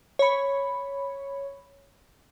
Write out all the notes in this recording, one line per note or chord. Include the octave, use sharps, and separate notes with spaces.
C#5 B5